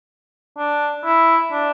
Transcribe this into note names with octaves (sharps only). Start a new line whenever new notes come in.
D4
E4
D4